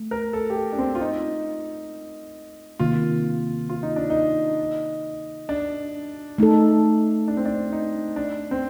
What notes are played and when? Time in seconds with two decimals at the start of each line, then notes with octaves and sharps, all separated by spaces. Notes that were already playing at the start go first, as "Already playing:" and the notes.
Already playing: A3
0.11 A#4
0.33 A4
0.50 G4
0.56 A4
0.73 D4
0.78 C4
0.95 F4
1.01 D#4
2.79 C3 D#3 A#3 F4
3.70 F4
3.83 D#4
3.96 D4
4.10 D#4
5.49 D4
6.38 A3 D#4 A4
7.28 D4
7.37 C4
7.45 D4
7.72 D#4
8.16 D4
8.51 C4